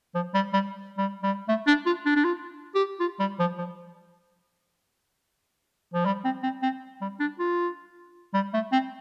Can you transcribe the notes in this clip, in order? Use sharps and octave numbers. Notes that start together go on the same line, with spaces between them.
F3
G3
G3
G3
G3
A3
D4
F4
D4
D4
F4
G4
F4
G3
F3
F3
F3
G3
C4
C4
C4
G3
D4
F4
G3
A3
C4